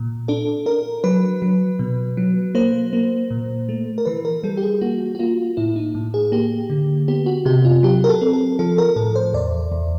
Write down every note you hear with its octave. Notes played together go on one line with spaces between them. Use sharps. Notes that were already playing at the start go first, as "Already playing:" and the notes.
Already playing: A#2
D4 A4
D4 A#4
F#3 B4
F#3
B2
F#3
A#3 C5
A#3
A#2
A3
A#4
E3 B4
A#4
G3 A4
G4
G#4
A#3 F#4
F#4
A#3 F4
A2 E4
D#4
A2
G#4
A#3 G4
D3
B3 G4
F#4
C3 G4
F4
F#3 G4
A#4
A4
C4
A4
F3 A4
A#4
A2 A4
C5
E2 D5
E2